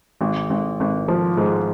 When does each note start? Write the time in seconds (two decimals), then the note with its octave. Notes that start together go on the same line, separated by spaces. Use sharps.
0.21 G#1
0.50 G#1
0.80 G#1
1.08 F3
1.37 G#2